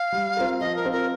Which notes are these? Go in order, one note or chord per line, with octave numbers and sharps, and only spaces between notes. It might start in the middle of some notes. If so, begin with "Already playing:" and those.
Already playing: F5
G3
C4 F4 A#4
F3 D#5
A#4
C4 F4
A#4